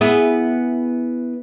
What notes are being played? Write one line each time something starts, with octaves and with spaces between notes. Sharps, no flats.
B3 E4 G#4